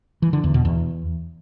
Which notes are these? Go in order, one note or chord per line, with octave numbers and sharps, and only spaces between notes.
E3
D3
E2
B2
E2